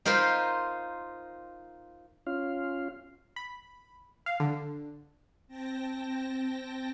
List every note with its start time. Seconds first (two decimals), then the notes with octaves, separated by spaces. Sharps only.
0.05 D#4 F4 A#4 C5 B5
2.27 C#4 F4 F5
3.36 B5
4.26 F5
4.40 D3
5.48 C4 G5 A5 A#6